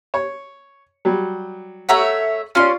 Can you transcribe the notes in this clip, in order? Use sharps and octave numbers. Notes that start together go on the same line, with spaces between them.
C#5
F#3 G3
A3 C#5 E5 F#5 A#5
C#4 F4 D5 C6